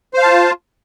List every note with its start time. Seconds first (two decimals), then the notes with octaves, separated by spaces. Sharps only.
0.14 C5
0.18 F5
0.23 A5
0.27 F4